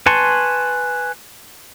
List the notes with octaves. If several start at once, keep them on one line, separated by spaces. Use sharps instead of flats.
B4 G#5 A5 C6 C#6